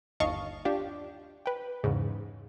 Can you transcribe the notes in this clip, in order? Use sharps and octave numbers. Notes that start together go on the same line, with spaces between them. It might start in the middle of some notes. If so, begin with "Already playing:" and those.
G1 D#2 D#5 F5 A5 C#6
D4 F4 G4
B4 G5
E2 G#2 C#3